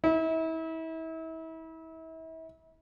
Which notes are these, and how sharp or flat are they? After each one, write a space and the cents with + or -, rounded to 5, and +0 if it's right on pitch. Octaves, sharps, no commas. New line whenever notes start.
E4 -35